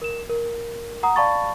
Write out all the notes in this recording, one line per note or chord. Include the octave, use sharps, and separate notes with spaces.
A#4 E7
A#4
F#5 A#5 D#6
D5 F5 A5 B5 C#6 A6